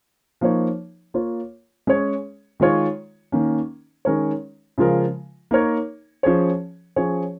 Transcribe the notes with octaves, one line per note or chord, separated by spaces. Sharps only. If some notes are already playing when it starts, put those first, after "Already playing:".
F3 A#3 D#4 C#5
A#3 F4 C#5
G#3 C#4 G#4 C#5
D#3 G#3 F4 C#5
D#3 A#3 C#4
D#3 G#3 C#4 A#4 C#5
C#3 F3 G#3 F4 A#4
A#3 D#4 A#4 C#5
F3 C#4 G#4 C#5
F3 C#4 G#4 C#5